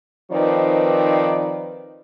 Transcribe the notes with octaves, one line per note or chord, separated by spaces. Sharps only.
D#3 F3 C4 D#4 B4 D5